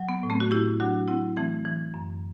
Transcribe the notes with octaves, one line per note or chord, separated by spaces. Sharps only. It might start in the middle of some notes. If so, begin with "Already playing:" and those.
Already playing: F#3
B3
A2
A3 C4
F#4
A2 E4 G4
F#3 D4 F#4
F#3 C4 E4
E3 A3 C4
E3
F#2